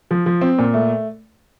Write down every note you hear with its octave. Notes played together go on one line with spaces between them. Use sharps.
F3
F3
C4
A#2
A3